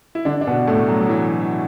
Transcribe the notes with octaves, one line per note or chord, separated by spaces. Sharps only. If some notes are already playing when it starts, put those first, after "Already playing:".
E4
D3 D4
D4
B2 B3
A2 A3
F#3
F#3
E3